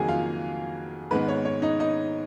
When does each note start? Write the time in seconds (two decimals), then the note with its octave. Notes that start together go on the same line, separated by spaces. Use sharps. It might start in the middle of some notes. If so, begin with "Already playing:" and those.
Already playing: F2 D#3 F#3 A#3 F#4 G#4 G#5
0.08 F4 F5
1.11 G#2 D#3 G#3 B3 B4
1.28 C#5
1.45 C#5
1.62 D#4 D#5
1.80 D#4 D#5